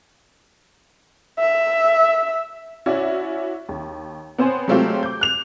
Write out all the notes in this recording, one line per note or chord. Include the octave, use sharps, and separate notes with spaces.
E5
C#4 E4 F#4 C#5 D5 E5
D#2
B3 C4 C5 C#5 G#5
F#3 G#3 A3 C4 F4 G4
D6 G6
F#6 F7